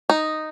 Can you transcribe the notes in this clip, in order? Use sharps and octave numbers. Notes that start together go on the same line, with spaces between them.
D#4